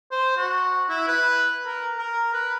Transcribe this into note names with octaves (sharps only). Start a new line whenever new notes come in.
C5
F#4
E4
B4
A#4
A#4
B4